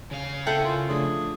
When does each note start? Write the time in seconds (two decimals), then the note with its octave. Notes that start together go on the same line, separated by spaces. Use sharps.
0.11 C#3 F5
0.47 C4 E4 A4 F#5 G5
0.65 F4 A#4 G#5
0.90 F3 A3 D4 G#4